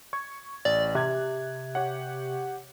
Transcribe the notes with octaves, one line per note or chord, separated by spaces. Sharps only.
C#6 G#6
A1 D5
C3 F#6 G#6
G4 C#5 F#5